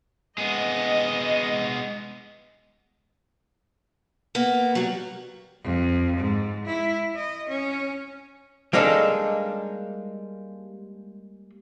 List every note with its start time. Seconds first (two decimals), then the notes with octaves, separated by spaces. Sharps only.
0.38 G#3 B3 D#5
4.35 A#3 B3
4.75 F#3 G3
5.63 F2
6.17 G#2
6.65 E4
7.15 D#5
7.49 C#4
8.73 G3 G#3 A#3 D4 D#4 A4